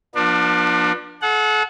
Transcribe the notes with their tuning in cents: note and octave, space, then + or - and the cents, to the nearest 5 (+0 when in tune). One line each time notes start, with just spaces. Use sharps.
F3 +15 B3 -45 D4 +25
A4 -40 F#5 -15